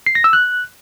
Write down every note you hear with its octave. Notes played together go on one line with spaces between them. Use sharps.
C7
A#6
E6
F#6